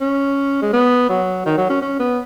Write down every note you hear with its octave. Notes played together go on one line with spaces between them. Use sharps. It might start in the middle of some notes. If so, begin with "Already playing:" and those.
C#4
G#3
B3
F#3
D#3
F#3
C#4
C#4
B3